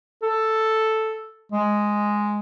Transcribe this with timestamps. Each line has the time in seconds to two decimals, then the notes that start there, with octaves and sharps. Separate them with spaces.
0.23 A4
1.52 G#3